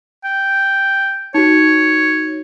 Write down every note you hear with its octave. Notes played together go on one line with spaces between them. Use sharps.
G5
D#4 F#4 C#5